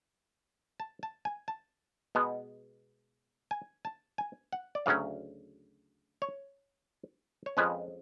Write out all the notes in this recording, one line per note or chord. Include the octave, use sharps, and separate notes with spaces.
A5
A5
G#5
A5
B2 G#3 B3
G#5
A5
G#5
F#5
D5
D2 C#3 F#3 C#4 F5
C#5
C#5
F2 F3 G#3 C#4 B4